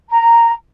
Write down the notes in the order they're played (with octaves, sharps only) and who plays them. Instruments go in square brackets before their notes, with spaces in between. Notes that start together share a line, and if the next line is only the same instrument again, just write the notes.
[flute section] A#5